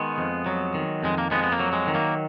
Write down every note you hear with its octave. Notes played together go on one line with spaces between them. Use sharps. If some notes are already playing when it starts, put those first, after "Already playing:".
Already playing: D#3 G#3 B3
F2
F#3
D#3
F2 G#3
A#3
F2 G#3 B3
B3
A#3
F#3
G#3
D#3
A#3